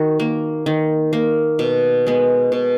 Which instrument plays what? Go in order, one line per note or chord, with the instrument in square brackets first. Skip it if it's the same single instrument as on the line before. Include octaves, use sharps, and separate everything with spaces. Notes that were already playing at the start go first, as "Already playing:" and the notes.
Already playing: [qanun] D#3 F#4
A#3
D#3
A#3
B2
G#3 B3
B2